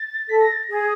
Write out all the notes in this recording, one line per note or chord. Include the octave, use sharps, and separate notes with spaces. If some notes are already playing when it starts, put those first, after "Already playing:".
Already playing: A6
A4 B6
A#6
A6
A#6
G#4